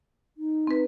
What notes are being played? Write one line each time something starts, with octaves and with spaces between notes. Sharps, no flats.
D#4
C4 B4